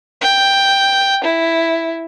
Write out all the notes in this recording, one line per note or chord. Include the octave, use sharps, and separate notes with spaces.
G5
E4